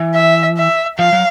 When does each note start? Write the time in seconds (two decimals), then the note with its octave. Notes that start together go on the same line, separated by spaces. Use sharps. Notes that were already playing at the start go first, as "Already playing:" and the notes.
Already playing: E3
0.15 E5
0.57 E5
0.99 F3 F5
1.13 F#3